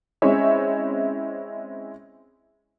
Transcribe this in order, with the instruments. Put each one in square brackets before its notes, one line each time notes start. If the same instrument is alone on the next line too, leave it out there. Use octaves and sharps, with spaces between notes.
[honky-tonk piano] G#3 C4 C#4 E4 C#5 E5